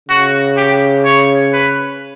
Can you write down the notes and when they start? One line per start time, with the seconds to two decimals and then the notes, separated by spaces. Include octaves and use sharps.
0.09 C#3 F#4
0.57 G4
1.05 C#5
1.53 B4